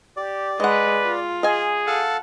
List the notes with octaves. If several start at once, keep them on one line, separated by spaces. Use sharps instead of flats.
G4 D5
G#3 B4 D#5 F#5
F4
G#4 D#5 G#5
A4 F5 F#5 A5